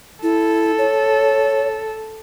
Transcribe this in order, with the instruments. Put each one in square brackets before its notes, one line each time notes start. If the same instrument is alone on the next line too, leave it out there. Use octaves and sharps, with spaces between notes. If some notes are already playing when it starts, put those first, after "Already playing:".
[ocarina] E4 [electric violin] A4
[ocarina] C#5